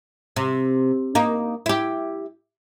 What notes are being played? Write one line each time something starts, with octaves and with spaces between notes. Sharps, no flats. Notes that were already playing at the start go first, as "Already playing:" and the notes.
C3
A#3 D#4
E4 G4